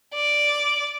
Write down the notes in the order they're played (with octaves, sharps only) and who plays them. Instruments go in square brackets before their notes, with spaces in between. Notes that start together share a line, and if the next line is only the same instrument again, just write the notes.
[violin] D5